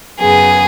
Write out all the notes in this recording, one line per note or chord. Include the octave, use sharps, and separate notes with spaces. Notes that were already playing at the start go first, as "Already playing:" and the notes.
F#2 C#3 B3 G#4